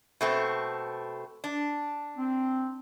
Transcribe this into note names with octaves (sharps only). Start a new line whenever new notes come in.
B2 A3 C4
D4
C4